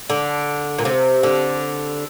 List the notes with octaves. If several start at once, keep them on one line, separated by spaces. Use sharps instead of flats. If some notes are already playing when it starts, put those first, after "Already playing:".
D3
A#2
C3
D3